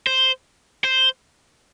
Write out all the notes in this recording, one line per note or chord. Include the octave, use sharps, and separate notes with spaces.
C5
C5